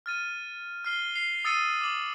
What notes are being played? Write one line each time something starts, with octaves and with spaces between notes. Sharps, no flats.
F6 A6 D#7
F6 C7 G7
F6 C7 F7
D#6 E6 A6 C7 C#7 D#7
D6 F#7